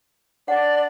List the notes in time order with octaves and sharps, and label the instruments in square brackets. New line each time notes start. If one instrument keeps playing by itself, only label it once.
[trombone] D4 [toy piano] C#5 F#5 [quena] D5